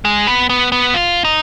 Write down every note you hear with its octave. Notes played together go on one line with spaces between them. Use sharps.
G#3
B3
B3
B3
F4
D#4